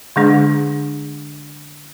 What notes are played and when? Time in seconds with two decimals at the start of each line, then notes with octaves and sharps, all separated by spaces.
0.16 D3 G#3 D4 G#4